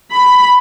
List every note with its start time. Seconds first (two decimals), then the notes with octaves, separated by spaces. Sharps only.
0.12 B5